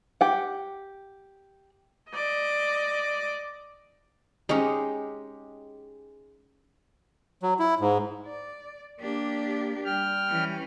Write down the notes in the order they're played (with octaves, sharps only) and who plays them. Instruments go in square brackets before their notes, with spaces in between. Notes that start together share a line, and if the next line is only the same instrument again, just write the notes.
[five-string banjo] G4 F#5
[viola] D5 D#5
[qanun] G#3 G4 [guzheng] C#4 D#4
[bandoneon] F#3
E4
G#2
[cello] D5
[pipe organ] A#3 [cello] D4 G4
[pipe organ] G3 G5 F6
[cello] E3 C#4